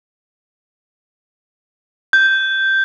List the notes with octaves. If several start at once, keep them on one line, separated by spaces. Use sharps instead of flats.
G6